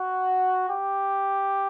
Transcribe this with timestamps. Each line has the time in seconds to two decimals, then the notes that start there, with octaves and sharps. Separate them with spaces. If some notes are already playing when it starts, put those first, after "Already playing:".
Already playing: F#4
0.69 G4